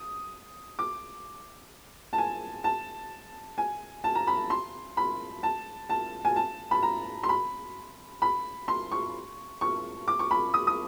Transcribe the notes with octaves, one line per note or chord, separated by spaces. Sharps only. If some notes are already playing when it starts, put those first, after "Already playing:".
Already playing: D#6
D6
A5
G#5
A5
G#5
A5
A#5
B5
C6
B5
A5
A5
G#5
A5
B5
A#5
C6
B5
B5
C6
C#6
C#6
D6
C#6
B5
D#6
D#6